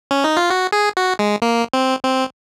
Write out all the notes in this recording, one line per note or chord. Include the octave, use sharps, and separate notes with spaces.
C#4
D#4
F4
F#4
G#4
F#4
G#3
A#3
C4
C4